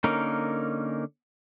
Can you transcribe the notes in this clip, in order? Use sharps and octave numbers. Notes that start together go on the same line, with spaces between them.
D3 A#3 C#4 D#4 A#4